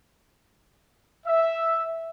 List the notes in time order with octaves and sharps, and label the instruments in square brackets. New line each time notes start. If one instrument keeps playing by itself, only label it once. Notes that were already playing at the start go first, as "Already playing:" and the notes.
[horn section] E5